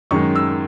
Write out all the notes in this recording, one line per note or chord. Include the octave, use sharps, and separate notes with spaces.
F#2 D#3 G#3 C#6
E6